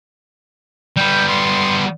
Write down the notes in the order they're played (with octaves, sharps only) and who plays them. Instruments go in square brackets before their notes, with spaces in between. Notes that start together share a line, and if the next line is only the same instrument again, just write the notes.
[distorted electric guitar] G3 B3 [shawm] G5
[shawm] C6